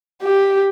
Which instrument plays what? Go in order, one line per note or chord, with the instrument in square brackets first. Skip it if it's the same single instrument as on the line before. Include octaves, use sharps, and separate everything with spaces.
[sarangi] G4